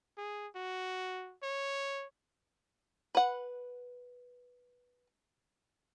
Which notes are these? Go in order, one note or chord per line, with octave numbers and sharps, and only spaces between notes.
G#4
F#4
C#5
B4 F#5